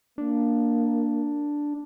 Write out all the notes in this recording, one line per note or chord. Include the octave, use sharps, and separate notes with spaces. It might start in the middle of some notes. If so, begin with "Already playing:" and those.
A#3 D4